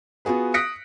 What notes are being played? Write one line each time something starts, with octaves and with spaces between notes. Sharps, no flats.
B3 F4 F#4 G#4 B4
D#6 F#6 A#6 B6 C#7 D7